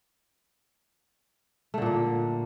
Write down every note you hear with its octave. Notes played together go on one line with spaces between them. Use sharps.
A#2 D3 A3 A#3